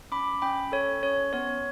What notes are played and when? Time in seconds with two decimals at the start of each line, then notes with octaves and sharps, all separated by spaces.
0.12 C#4 B5 D6
0.42 C#4 G5 B5
0.72 A4 C#5
1.03 C#4 C#5
1.33 B3 C#5